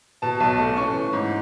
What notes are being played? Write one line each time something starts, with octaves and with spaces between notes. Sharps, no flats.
B2 A5
B1 A5
A3
C#4 C#6
E3
G#2